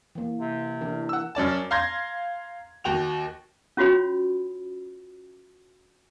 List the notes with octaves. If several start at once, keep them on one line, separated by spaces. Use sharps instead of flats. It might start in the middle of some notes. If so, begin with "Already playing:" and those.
E3 A#3
C3
E3 D4 A#4
F#5 E6
F#2 C#4 D5 A5
F5 A#5 C6 G6 G#6 A#6
D#2 F#4 G5 F7
C#4 F4 F#4 C#5 B5